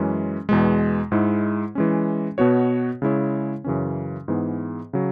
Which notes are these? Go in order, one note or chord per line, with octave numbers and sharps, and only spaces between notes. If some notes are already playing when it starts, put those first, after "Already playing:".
Already playing: F#2 E3 G#3 C#4
E2 B2 G#3
G#2 G#3 E4
E3 G#3 C#4
B2 B3 F#4 C#5
C#3 G#3 E4 C#5
F#2 C#3 E3 C#4
G#2 E3 B3 G#4
C#3 F#3